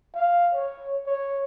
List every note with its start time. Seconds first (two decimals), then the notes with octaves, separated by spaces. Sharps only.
0.14 F5
0.54 C#5
1.07 C#5